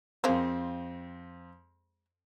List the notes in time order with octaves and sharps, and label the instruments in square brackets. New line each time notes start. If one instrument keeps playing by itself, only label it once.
[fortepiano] F2 C4 [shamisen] G#3 A#3 C5